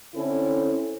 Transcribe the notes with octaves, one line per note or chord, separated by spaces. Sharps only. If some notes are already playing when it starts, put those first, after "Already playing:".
D3 C4 C#4 E4 A4